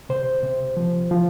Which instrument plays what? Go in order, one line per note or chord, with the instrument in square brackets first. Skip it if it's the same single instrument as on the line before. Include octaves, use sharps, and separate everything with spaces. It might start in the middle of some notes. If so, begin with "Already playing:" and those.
[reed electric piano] C3 C5
C3
F3
F3